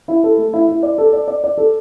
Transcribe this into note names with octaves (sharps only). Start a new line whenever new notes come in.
E4
A4
A3
E4
E4
D5
A4
D5
D5
D5
A4